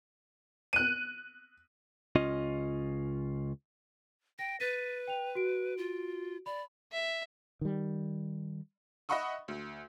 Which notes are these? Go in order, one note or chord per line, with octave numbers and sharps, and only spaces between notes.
F#6 D#7
C#2 C#4 F4 D#5
G5 A#6
B4 A6 B6 D#7
G5 F7
F#4 D7
F4
D5 B5
E5
D#3 G3
D#5 E5 F#5 B5 C#6 D#6
D2